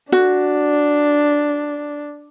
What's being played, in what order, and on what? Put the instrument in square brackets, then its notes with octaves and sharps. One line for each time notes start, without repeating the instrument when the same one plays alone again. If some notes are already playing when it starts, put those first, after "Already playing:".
[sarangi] D4 [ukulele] F#4